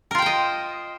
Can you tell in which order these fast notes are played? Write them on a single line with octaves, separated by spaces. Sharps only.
A#4 F4 G5 C5 D#5